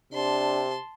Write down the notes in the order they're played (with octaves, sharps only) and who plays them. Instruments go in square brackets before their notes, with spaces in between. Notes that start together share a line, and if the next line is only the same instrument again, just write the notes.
[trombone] C3 [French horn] D4 [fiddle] A5 C6